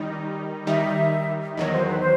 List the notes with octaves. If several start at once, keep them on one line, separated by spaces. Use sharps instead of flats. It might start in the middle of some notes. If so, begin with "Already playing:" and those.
Already playing: D#3 G3 D#4
D#3 G3 D#4 E5
E2 D#3 F#3 D#5
C5
B4
C5